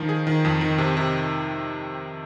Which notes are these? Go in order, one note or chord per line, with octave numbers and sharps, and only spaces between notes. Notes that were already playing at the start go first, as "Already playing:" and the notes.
Already playing: D#3 F3 D#4
G#4
D#3
F2
D#3
C3
C3